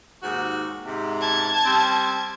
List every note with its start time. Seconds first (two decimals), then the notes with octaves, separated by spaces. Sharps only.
0.23 D#2 G#2 F#4
0.86 G#2 C3
1.21 A5 G#6
1.65 G3 C4